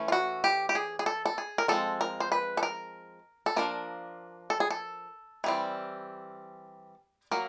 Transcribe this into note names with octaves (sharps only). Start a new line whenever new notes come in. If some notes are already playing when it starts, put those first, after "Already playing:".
Already playing: E3 A3 C#4
F4
F#4
G4
G4
G#4
G#4
A4
A4
G#4
A#4
F3 G#3 C4 A4
A#4
C5
B4
A4
A#4
A4
F3 A#3 D4 A#4
A4
G#4
A4
E3 G3 C4
F#3 A#3 A#4